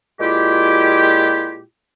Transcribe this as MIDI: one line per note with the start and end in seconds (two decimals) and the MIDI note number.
0.20 1.61 46
0.20 1.61 56
0.20 1.61 64
0.20 1.61 65
0.20 1.61 67